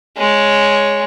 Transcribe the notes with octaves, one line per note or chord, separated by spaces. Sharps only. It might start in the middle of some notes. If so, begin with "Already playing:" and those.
G#3 C#5